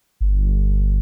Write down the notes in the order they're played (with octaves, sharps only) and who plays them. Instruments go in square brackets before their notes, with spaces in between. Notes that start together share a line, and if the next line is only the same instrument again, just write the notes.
[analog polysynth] G1